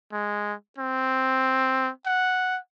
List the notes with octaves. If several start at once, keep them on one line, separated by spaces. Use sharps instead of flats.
G#3
C4
F#5